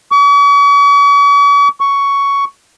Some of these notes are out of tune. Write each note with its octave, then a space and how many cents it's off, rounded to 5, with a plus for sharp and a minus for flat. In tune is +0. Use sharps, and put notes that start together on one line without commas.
C#6 +45
C#6 +10